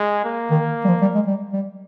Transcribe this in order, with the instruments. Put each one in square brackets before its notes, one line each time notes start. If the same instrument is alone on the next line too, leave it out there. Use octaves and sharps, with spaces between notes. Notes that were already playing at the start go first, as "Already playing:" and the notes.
Already playing: [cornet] G#3
A#3
[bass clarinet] D#3
G3
F3
G3
G#3
G3
G3